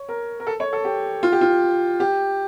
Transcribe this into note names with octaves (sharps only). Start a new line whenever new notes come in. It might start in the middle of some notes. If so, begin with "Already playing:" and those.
Already playing: C#5
A#4
A#4
A4
C#5
A4
G4
F4
G4
F4
G4